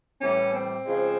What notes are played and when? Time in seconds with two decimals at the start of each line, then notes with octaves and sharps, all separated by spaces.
0.20 A2 E3 G3 C#4
0.53 C4
0.85 C#3 F3 G#3